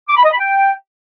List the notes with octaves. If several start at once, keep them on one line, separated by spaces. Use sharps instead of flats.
D6
B5
D#5
B5
G5